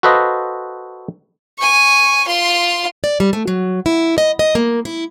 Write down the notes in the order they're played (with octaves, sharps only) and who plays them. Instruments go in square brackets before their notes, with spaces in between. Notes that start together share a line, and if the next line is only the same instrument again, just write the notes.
[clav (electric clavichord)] F#4 A4 B4 C5 D#5 F5
[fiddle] G#5 C#6
F4 C6
[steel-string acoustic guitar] D5
G3
A3
F#3
E4
D#5
D#5
A#3
E4